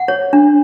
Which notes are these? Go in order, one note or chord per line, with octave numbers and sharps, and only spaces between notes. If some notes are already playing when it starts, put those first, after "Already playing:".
Already playing: F#5
C#5
D4